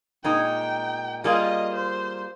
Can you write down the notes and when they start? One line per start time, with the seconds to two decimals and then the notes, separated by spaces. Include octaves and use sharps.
0.24 A#2 G#3 D#4 G5
1.24 G3 A#3 F4 G#4 D#5
1.75 C5